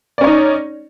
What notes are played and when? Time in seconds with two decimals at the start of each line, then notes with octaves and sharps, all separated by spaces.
0.18 D5
0.21 C#4
0.24 C#5
0.27 D#4